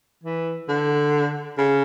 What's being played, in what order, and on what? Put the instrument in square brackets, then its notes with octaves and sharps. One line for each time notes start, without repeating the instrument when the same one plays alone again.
[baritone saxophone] E3
D3
C#3